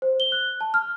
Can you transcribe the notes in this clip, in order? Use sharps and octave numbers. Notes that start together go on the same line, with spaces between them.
C5
G7
F#6
A5
F6